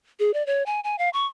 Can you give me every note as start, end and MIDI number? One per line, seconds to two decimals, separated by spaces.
0.20 0.33 68
0.34 0.45 74
0.46 0.65 73
0.66 0.80 80
0.84 0.98 80
0.98 1.09 77
1.13 1.26 85